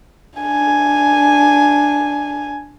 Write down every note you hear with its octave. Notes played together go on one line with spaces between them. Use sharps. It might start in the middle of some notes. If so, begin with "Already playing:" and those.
D4 G#5